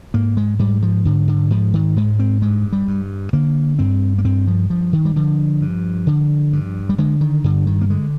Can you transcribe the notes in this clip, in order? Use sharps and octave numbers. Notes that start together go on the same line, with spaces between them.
G#2 A#3
G#3
G#2 G3
F3
G#2 D3
D3
G#2 F3
D#3
G#2 G#3
C4
G2 G#3
G3
G2
D3 A#3
G2 C4
A#3
G2 C4
F3
G2 F3
D#3
G3
D3 F3
G2
D3
G2
G3
D3 G#3
D#3
G2 D3
D#3
A#3
D3 G#3